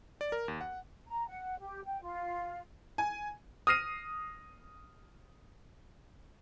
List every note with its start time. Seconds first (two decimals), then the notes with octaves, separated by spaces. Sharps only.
0.21 D5
0.32 A#4
0.48 D#2
0.61 F#5
1.07 A#5
1.28 F#5
1.61 G4
1.85 G5
2.02 F4
2.98 G#5
3.67 D#6 F6 A#6 C7 D#7